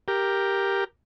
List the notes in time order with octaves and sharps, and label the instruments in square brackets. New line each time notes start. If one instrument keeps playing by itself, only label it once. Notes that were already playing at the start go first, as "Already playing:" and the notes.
[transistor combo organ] G4 A#4